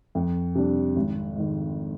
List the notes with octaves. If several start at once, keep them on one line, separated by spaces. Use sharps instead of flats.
F2
C3 G3 D4
G#1
G#2 D#3